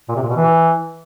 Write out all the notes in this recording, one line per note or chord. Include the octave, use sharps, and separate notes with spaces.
A#2
C3
A#2
B2
E3